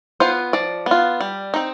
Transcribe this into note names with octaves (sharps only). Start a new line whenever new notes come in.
B3 F4 C5
F3 D5
B3 F4
G3
C4 D#4